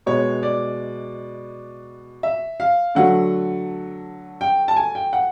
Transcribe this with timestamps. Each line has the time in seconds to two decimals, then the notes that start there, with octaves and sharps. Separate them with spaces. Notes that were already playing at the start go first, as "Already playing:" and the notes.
0.06 B2 G#3 B3 C#5
0.43 D5
2.23 E5
2.60 F5
2.95 D3 F#3 A3 F#5
4.41 G5
4.68 A5
4.77 G#5
4.95 G5
5.13 F#5